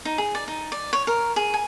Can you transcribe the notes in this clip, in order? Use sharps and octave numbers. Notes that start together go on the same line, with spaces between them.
D#4
G#4
D5
D#4
D5
C#5
A#4
G#4
G#5